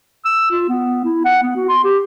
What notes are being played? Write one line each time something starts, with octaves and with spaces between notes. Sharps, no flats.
E6
F4
B3
E4
F#5
B3
F#4
C6
G4